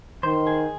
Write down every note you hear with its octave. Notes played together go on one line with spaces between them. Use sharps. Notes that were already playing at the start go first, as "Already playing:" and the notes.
D#3 C5
G#4